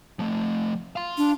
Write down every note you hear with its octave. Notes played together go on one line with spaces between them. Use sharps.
F3 A3
F5 C6
D4